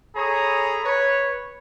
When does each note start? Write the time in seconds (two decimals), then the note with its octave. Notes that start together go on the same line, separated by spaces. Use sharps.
0.16 G#4 A4 C#5 A#5 B5 D#6
0.84 B4 C#5